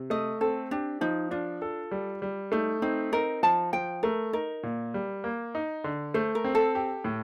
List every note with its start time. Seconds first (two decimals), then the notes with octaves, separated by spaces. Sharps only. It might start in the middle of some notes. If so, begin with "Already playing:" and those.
Already playing: C3
0.10 A3 D#5
0.41 C4 A4
0.71 D4 G4
1.01 F3 D#4
1.31 D4 F4
1.62 A4
1.91 G3
2.22 G3
2.52 A3 D#4
2.82 C4 D#4
3.13 D#4 A#4
3.43 F3 A5
3.73 F3 G5
4.03 A3 A#4
4.33 D#4 A#4
4.63 A#2
4.94 G3
5.24 A#3
5.55 D#4
5.84 D3
6.14 A3 C5
6.35 A#4
6.44 C4
6.55 A4
6.75 G4
7.04 A2